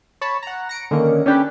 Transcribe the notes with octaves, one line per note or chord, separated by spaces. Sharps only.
C#5 A5 B5
F#5 A#5
A#6 C#7 D7
D3 D#3 A#3 C#4
C#4 D4 G4 A4 B4